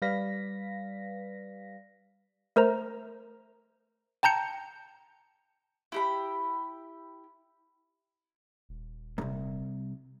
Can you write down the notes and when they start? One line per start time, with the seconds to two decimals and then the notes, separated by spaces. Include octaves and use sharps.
0.02 G3 B4 D5 F5 A#6 B6
2.56 A3 A#4 C5 A#5
4.23 G5 A5 A#5 G6 C#7
5.92 E4 G4 B5
8.69 D#1
9.18 C2 F#2